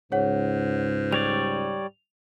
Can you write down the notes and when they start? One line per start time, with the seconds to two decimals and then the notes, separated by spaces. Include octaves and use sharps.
0.12 C#2 G#2 G#4 C#5 F#5
1.12 G3 C#5 D5 F7